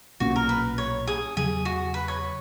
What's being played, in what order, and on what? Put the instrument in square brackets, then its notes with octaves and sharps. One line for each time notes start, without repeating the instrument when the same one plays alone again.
[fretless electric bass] B1 A#2 A#3 C#4 [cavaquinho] F#4
[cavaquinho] A#4
B4
C#5
G#4
[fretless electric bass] E2 C#3 F#3 [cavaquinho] G#4
[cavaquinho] F#4
B4
C#5